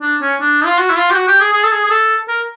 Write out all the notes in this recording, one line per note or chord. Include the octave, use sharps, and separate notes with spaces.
D4
C#4
D4
F4
F#4
E4
F4
G4
F#4
G4
G#4
G#4
A4
G#4
G#4
A4
A#4